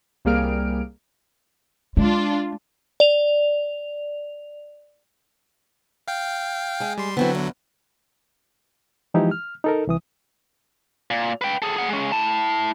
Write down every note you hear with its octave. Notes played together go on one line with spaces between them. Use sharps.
C2 G3 A#3 G#4 F6 D7
G#3 D4 F4
D5 F7
F5 G5
G#3 G#4
G3 C6
D3 F#3 B3 C4 E4
E2
E3 F3 G#3 D#4 E4 G4
F6
D#4 A4 A#4
C2 E3 D#6
A#2
B4 G5
G#4 A4
G#4 F#5
G#3 C#4
E4 A5